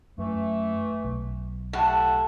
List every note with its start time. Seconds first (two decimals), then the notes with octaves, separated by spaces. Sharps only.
0.18 F#2 E3 A3
1.04 B1
1.73 A2 G4 E5 F#5